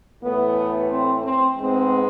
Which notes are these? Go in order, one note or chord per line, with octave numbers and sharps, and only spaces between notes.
A2 E3 A3 B3
C4
C4
G#2 G#3 B3 C4